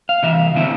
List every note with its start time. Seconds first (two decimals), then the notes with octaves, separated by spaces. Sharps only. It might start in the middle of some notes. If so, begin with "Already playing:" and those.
0.09 F5
0.23 C3 E3 E5
0.55 D3 A3 C4 E4 E5